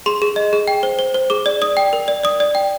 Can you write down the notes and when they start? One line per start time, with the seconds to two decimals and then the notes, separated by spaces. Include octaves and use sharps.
0.06 G#4 C6
0.22 G#4
0.36 D#5
0.53 G#4
0.68 G5
0.83 C5
0.99 C5
1.14 C5
1.30 G#4 D6
1.46 D5
1.61 D5 D#6
1.77 G5
1.93 A#4
2.08 D5
2.24 D5 D#6
2.40 D5
2.55 G5